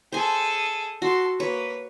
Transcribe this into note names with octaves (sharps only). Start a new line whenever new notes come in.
G#4 A4 C5 G#5
F#4 A4 C6
A#3 B4 C#5